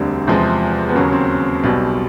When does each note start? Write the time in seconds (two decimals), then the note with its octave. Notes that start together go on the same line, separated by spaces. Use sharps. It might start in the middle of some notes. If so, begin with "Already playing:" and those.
Already playing: E1 D2 D3 G3 C4
0.27 E2 C3 F3 G#3 C4
0.89 B3
0.95 D#2 C#3 F#3 A#3
1.12 C4
1.64 B1 B2 G3